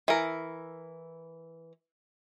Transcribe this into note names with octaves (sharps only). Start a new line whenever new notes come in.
E3 A#4